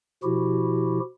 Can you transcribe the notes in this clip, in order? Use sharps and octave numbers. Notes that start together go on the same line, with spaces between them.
B2 F3 E4 F#4 G4